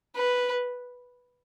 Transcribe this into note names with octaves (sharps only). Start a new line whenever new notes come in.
B4